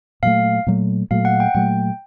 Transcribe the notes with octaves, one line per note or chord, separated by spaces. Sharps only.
A#2 F#3 A3 F5
A#2 F#3 A3
A#2 F#3 A3 F5
F#5
G5
A#2 F#3 A3 G5